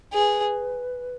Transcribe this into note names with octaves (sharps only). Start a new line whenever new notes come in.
G#4 B4